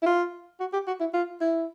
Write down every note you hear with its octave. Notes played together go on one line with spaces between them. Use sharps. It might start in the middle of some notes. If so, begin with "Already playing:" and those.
E4
F4
F#4
G4
F#4
E4
F4
E4